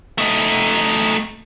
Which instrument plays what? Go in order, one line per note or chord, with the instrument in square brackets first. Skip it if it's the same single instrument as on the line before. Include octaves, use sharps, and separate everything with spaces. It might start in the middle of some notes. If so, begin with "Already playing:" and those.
[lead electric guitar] A3 D#4